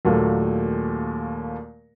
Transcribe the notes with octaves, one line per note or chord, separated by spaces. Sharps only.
D#2 A#2 F#3 A3